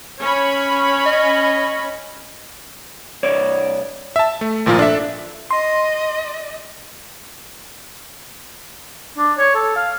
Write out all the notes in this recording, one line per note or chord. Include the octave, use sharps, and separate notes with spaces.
C#4 C#5 B5
D#5
C2 C#5 D5
E5 A5
A3
G#1 A#2 F3 F4
D4 A4 E5
D#5 C6
D4
C#5
A4
F5